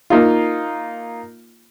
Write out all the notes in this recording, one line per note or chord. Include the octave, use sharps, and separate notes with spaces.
A#3 D#4 F4